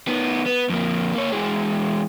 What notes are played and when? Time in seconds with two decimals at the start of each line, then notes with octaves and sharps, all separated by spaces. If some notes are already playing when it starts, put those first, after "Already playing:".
0.08 D#3 B3
0.46 B3
0.70 F2 A#3
1.14 A#3 C#5
1.32 E3 G#3